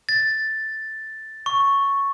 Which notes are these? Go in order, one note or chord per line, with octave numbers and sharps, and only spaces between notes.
A6
C#6